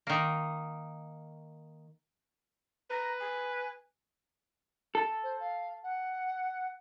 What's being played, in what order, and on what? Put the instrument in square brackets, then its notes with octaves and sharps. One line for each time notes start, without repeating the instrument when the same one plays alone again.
[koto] D#3 A#3
[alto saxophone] B4 [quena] A#5
[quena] G#5
[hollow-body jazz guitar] A4
[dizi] C5
F5
F#5